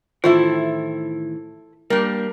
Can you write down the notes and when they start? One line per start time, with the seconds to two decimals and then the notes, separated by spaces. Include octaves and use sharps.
0.24 A2 D#3 E3 E4 F4 A4 C5
1.90 G3 A#3 D4 G4 A#4